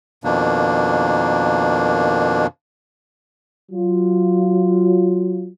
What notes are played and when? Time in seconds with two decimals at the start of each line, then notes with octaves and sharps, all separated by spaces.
0.24 F2 B2 D#3 A#3 D4
3.72 F#3 F4